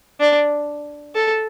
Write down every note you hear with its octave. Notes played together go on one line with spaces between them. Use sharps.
D4
A4